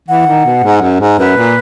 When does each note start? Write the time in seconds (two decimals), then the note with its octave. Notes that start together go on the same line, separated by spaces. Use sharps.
0.08 E3 F#5
0.27 D#3
0.45 B2
0.64 G#2
0.81 F#2
1.00 G#2
1.18 F#2 B4
1.37 A#2